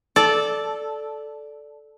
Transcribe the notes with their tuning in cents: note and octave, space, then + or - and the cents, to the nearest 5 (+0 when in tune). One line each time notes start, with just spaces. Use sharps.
A4 -10 D5 +0